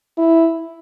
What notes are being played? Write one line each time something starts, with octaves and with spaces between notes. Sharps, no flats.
E4